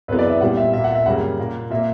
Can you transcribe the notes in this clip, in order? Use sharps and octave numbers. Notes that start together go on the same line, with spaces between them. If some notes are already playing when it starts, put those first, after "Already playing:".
F#2 C#3 E3 B3 B4
D5
E5
A#2 G3 B3 F#5
E5
A#2 A#3 E5
F#5
E5
F#2 C#3 G3 A#3 F#5
A#2 A#3
A#2 A#3 E5